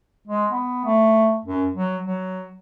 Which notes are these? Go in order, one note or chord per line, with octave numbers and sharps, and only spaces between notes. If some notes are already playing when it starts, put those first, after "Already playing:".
G#3
B3
A3
F#2
F#3
F#3